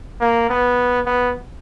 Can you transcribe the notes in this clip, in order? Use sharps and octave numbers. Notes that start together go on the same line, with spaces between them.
A#3
B3
B3